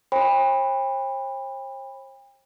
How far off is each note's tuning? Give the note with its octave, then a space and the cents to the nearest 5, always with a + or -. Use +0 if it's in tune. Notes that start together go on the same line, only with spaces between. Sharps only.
C5 +45 G5 +40 B5 +0